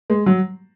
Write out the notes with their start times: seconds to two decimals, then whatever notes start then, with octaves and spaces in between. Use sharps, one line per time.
0.10 G#3
0.26 F#3